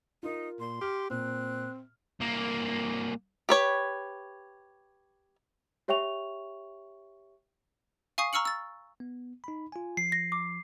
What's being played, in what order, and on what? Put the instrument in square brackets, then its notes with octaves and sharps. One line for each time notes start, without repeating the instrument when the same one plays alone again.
[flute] D#4 [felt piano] F4 A#4
[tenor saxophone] A#2 [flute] C6
[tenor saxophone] G4 [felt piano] F6
[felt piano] A#2 [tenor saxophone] C4 [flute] F#6
[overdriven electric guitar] C2 A#3
[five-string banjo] G4 B4 C#5
[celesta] G4 C#5 E5 G5 C#6 F7
[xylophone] F5 G#5 C#6 D#6 C7
A#5 C#6 E6 F6 C#7 F#7
E6 A6
[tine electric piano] B3
D#4 B5
F4 G#5
[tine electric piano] F3 [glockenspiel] C7
[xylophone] A#6
D6